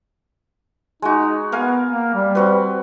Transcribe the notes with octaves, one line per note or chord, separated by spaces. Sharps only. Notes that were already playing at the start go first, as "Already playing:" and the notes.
G#3 D#4 F#4
B3 A#4 F5 G#5
A#3
G3
C4 F#4 B4